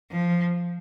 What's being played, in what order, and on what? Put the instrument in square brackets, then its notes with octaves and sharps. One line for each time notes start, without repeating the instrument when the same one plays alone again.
[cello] F3